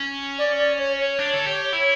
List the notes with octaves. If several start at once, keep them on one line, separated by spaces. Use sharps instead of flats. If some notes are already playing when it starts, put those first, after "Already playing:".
Already playing: C#4
D5
D5
C#5
C#5
D4
A4
G4
E4